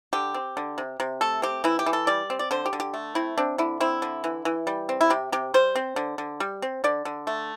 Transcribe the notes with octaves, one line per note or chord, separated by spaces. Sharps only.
D3 G4
C4
D3
C3
C3
A3 A4
C4 G4
E3 E4
G4
E3
A4
G3 D5
C4
D5
D3 C5
G4
D3
G4
A3
C4 E4
C4 D4
D3 E4
C4 E4
D3
E3
E3
G3
C4
E4
C3 G4
C3 G4
G3 C5
C4
D3
D3
G3
C4
D3 D5
D3
A3